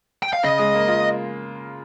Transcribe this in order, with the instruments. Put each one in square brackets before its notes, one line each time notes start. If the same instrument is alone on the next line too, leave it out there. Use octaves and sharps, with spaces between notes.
[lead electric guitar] G5
F5
[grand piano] C#3 [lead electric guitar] D#5
[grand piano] G#3
A#3
F4